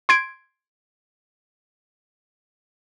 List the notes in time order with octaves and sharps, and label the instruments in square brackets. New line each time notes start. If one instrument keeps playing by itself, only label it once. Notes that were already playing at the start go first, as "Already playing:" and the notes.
[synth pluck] C6 G#6 D7